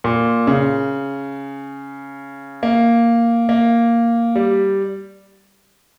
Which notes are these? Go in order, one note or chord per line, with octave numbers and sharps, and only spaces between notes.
A#2
C#3
A#3
A#3
G3